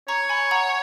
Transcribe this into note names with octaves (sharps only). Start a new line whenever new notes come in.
C#5 A#5 C#6
G#5 B5
F#5 A#5